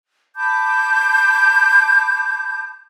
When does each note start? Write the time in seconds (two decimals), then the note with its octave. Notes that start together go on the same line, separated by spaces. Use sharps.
0.36 A5 B5 D6 G6